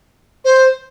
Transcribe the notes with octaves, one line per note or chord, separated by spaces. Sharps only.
C5